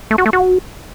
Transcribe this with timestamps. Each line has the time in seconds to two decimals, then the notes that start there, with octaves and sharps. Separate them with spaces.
0.11 A3
0.18 F#4
0.26 A3
0.33 F#4